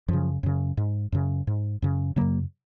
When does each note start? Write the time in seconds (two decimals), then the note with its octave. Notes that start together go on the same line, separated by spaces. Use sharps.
0.08 F#2 C#3 F3
0.43 F#2 C#3
0.77 G#2
1.12 F#2 C#3
1.47 G#2
1.82 F#2 C#3
2.16 F#2 C#3 F#3 A#3